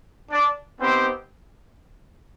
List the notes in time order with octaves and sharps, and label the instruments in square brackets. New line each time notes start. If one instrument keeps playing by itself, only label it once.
[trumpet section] D4 D5
B3 C4 D#4 G4 C5